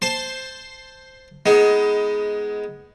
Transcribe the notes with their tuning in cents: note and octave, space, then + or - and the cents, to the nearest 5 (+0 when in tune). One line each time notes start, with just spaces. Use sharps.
C5 +0 A5 +0 C6 +10
G#3 +10 B3 +10 D#4 +20